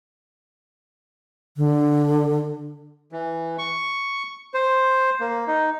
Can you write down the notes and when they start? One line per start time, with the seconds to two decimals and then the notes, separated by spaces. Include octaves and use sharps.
1.57 D3
3.12 E3
3.59 C#6
4.54 C5
5.20 A#3
5.47 D#4